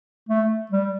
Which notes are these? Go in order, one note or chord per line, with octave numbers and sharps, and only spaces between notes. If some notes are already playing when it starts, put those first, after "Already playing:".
A3
G3